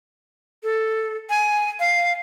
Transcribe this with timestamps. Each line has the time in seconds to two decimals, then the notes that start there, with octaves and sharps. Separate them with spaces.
0.63 A4
1.30 G#5
1.80 F5